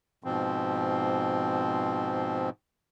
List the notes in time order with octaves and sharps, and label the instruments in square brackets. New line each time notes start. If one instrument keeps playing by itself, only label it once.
[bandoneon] G#2 B2 F3 C4